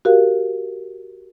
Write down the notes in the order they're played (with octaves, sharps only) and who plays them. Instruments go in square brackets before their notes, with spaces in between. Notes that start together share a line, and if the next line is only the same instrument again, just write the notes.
[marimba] F#4 G4 A#4 F5